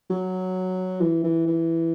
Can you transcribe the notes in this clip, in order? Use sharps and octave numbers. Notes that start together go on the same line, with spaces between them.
F#3
E3
E3
E3